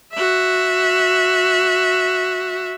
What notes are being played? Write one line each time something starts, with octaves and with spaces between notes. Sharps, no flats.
F#4 E5